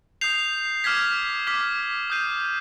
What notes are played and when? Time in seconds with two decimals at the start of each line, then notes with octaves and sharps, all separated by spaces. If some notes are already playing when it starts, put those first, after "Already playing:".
0.21 D#6 G6 C7 F7
0.84 D6 F6 G#6 B6
1.47 D6 F6 B6
2.10 D#6 G6 C7 D#7